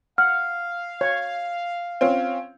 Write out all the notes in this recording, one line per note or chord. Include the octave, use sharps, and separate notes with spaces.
F5 F#5 F6
C#5
C4 C#4 F4